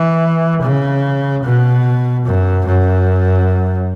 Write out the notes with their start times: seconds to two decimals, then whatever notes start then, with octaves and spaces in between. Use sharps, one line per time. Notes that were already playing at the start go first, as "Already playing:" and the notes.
Already playing: E3
0.62 C#3
1.43 B2
2.25 F#2
2.66 F#2